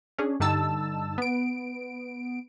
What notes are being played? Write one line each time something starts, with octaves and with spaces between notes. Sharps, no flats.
C#4 D4 G#4
G2 D3 G3 D#4 A5 E6
B3 D7